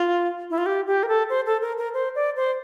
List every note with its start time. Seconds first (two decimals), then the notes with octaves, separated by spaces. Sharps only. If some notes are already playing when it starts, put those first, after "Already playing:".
Already playing: F4
0.50 E4
0.58 F4
0.66 G4
0.87 G4
1.03 A#4
1.08 A4
1.29 C5
1.46 A4
1.62 A#4
1.78 A#4
1.94 C5
2.15 D5
2.36 C5